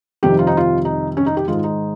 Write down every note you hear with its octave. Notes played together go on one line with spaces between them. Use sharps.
F2 C3 D#3 G3 G4
F4
D#4
F4
D#4
C#4
D#4
G4
G#2 D#3 G#3 F4
D#4